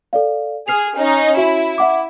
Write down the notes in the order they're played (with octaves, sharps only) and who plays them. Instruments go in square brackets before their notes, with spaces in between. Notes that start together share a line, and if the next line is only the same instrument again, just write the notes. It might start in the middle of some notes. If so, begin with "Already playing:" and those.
[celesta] A4 D5 F5
[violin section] G#4 [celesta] F6 C7 F7
[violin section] C#4 D#4
[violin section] E4 [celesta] F#4 E5
[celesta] E5 F#5 D6